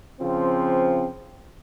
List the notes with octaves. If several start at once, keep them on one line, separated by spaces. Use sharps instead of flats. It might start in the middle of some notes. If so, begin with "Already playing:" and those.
C#3 F3 C4